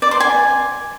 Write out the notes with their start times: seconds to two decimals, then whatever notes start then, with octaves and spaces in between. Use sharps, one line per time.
0.02 D5
0.11 C6
0.20 G#5